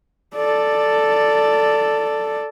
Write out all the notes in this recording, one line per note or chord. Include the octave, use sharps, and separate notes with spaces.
A4 D5